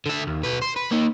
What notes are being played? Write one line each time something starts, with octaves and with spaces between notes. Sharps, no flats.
D3 E5
D#2
B1 B4
C5
B4
A#3 D#4